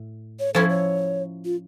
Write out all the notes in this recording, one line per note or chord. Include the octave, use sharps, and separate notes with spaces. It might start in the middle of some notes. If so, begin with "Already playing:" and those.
Already playing: A2
C#5
F3 C#4 E4 A4
C#5
F4